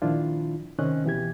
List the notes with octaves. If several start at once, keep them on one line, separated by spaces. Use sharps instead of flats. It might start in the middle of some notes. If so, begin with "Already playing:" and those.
A#2 D#3 F3 D4 E4 F4
C3 D#3 C4 C#4 D#5 F#6
B2 E3 G4 G#6